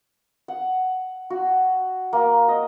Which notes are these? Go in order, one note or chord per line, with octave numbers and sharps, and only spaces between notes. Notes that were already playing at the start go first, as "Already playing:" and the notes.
F#5
F#4
A#3
D#5